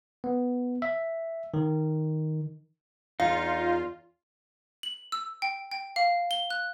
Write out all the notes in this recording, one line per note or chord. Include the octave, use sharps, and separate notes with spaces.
B3
E5
D#3
E2 D#4 F4 F5
F#7
E6
G5
G5
F5
G7
F#6